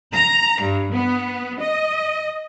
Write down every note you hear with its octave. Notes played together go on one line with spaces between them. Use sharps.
A#5
G2
B3
D#5